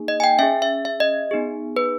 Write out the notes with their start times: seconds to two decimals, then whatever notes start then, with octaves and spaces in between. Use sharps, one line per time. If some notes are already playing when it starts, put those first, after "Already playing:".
Already playing: A#3 D#4 G#4
0.08 D#5
0.20 G#5
0.24 G5
0.39 C#4 G#4 E5
0.62 E5
0.85 E5
1.00 D#5
1.31 B3 D#4 G#4
1.76 B4